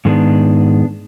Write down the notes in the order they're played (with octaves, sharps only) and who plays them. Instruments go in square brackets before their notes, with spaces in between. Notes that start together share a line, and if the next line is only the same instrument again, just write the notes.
[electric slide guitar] G#2 D#3 G#3 B3 D4